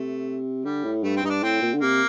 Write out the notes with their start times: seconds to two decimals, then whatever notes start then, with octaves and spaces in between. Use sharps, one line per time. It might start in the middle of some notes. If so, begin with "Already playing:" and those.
Already playing: C3 A3
0.65 D3 G3
0.84 A2
1.03 G2 A3
1.16 C4
1.23 G2 D#4
1.29 D4
1.43 A2 C4
1.62 A#2
1.74 D3
1.81 C3 A#3